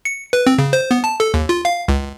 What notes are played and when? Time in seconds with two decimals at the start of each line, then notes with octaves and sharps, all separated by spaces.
0.05 C#7
0.33 B4
0.47 C4
0.58 C#3
0.73 C5
0.91 B3
1.04 A5
1.20 A4
1.34 D#2
1.49 F4
1.65 F5
1.88 C#2